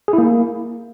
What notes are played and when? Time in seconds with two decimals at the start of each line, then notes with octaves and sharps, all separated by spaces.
0.08 G#4
0.13 E4
0.18 A#3